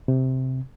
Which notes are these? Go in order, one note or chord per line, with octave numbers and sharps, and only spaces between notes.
C3